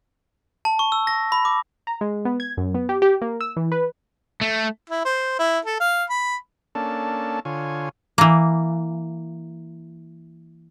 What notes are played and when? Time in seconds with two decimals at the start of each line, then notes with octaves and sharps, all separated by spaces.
0.65 A5
0.79 C#6
0.92 E6
1.07 A#6
1.32 B5
1.45 D6
1.87 A#5
2.01 G#3
2.25 B3
2.40 G#6
2.57 F#2
2.75 B3
2.89 G4
3.02 G4
3.22 A#3
3.41 E6
3.56 E3
3.72 B4
4.41 A3
4.90 E4
5.05 C5
5.39 E4
5.65 A4
5.80 F5
6.10 B5
6.75 A#3 C#4 D4 A4 A5
7.45 D3 F4 C#5 G#5
8.18 E3 A#3